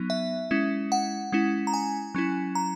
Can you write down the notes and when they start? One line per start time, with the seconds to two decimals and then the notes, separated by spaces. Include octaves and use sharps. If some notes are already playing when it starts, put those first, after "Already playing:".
Already playing: F#3 B3 D#4
0.10 E5
0.51 G#3 C#4 E4
0.92 F#5
1.32 G#3 C#4 E4
1.67 A#5
1.74 G#5
2.15 F#3 C#4 E4
2.55 A#5